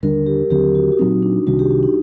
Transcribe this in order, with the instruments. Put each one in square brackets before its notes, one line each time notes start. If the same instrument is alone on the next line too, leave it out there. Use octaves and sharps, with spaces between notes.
[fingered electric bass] D#2 D3 G3 D4 [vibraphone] A#4
[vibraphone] G4
[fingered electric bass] D#2 D3 F#3 C4 [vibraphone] G4
[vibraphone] F#4
F#4
[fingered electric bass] A#2 F#3 C4 [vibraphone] D#4
[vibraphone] D4
[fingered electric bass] C2 C3 D#3 G3 [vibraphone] F#4
[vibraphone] G4
F#4
D#4